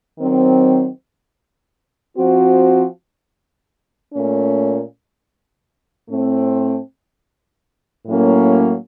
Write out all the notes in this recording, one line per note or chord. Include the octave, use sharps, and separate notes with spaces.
D#3 F#3 C4
F3 C4 F#4
A#2 A3 C#4
A2 A3 C4
A2 F#3 A#3 C#4